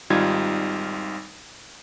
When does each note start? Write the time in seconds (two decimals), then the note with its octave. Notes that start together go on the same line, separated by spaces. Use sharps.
0.10 G#1 G3 D#4 F4 G#6